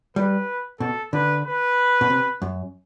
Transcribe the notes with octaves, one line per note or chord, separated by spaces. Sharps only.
G3 B4
B2 A4
D3 B4
B4
B2
C3
F#2